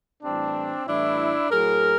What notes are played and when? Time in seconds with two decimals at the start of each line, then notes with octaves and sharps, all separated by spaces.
0.22 A2 E3 G3 C4 D4
0.86 A2 E3 G3 D4 E4
1.50 A2 F#3 G#4 A#4